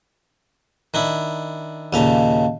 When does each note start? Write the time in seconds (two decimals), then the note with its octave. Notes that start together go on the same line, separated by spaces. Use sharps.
0.94 D#3 D4 E4
1.93 D#2 A#2 C#3 D#5 F5 A5